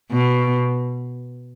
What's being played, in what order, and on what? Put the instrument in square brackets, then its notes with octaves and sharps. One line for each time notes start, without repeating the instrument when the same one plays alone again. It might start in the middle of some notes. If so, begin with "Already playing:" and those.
[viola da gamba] B2